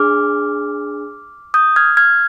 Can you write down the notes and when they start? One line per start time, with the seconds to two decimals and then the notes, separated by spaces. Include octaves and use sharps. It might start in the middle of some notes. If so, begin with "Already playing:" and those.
Already playing: D4 G#4 D6 F6
1.54 D#6 G6
1.76 F6 G#6
1.97 F6 G#6